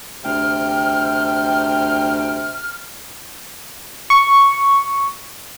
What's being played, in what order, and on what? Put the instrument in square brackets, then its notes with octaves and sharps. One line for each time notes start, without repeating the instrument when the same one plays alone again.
[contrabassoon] D2 [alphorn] C3 [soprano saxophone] G5 [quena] F6
[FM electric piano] C#6